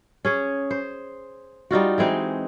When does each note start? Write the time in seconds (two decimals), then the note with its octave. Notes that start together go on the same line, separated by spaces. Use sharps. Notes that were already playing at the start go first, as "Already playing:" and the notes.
0.25 C#4 G#4 C#5
0.71 C5
1.71 G3 D#4 F4 F#4
1.98 E3 G#3 C4 D#4